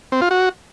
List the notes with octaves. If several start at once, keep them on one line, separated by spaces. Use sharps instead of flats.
C4
F4
F#4